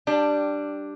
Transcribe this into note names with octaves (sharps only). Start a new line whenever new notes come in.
G3 D4 G4